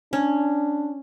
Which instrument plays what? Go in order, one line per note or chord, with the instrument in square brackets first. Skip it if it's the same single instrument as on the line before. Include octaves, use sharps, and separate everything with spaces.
[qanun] C#4 [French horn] D4